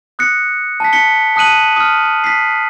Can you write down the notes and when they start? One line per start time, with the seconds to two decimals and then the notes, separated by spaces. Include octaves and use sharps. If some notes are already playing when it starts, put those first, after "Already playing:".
0.19 D#6 F#6 A#6 C#7
0.80 A5 B6
0.93 B6 C#7 G7
1.36 A5 D#6 F#6 D#7 F#7
1.76 D#6 F6
2.24 B6 C7